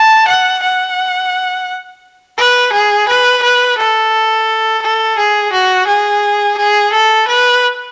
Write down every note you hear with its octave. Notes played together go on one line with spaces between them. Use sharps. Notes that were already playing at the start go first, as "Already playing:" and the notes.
Already playing: A5
F#5
F#5
B4
G#4
B4
B4
A4
A4
G#4
F#4
G#4
G#4
A4
B4